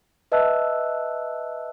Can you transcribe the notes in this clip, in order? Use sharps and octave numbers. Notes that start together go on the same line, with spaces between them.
B4 D#5 E5 A5 E6 F#6